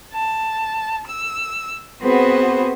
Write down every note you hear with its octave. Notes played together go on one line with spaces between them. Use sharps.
A5
E6
B3 C4 F#4 G#4 B4 C5